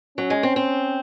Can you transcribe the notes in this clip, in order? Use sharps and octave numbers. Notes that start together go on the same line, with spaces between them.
F#3 C#4
G#3
C4
C4